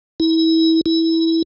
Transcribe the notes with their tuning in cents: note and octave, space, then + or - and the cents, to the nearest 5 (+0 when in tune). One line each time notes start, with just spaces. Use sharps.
E4 -30
E4 -15